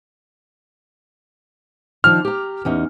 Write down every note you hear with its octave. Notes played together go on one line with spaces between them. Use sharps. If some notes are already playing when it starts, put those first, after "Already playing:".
D#3 F3 D4 F6
G4 A#5
E2 C#4 D#4